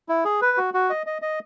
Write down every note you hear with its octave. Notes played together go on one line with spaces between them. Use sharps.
E4
G#4
B4
F#4
F#4
D#5
D#5
D#5